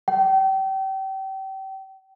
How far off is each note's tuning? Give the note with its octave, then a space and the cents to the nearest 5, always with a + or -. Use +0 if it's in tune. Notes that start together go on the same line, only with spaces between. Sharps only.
G5 -30